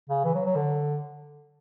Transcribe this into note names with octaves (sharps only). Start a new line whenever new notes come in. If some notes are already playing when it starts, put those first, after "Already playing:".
C#3
E3
F#3
F#3
D3